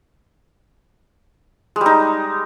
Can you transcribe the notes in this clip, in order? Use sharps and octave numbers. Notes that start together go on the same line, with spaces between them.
G3 G#3 D#4